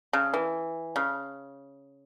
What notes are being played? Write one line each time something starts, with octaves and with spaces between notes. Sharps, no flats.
C#3
E3
C#3